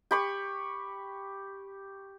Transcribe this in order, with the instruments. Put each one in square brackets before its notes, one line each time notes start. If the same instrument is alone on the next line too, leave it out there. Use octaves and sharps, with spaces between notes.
[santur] G4 B5 C#6